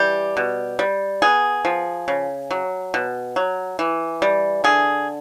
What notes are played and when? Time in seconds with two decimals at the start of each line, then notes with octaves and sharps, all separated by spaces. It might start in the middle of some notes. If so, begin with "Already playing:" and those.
Already playing: E3 G3 G4
0.37 B2
0.79 G3
1.22 B3 G#4
1.65 F3
2.08 C#3
2.51 F#3
2.94 B2
3.36 F#3
3.79 E3
4.22 G3
4.64 D3 G#4